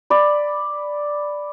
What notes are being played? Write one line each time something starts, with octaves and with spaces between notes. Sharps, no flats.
D5 B5